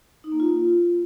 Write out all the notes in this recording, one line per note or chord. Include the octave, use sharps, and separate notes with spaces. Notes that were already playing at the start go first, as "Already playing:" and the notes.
D#4
A#3
F4